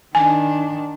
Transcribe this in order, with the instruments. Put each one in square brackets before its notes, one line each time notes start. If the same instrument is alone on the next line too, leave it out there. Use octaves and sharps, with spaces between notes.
[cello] D#3 D4 [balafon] G#5